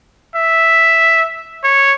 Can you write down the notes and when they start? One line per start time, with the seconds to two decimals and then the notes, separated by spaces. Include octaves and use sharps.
0.36 E5
1.64 C#5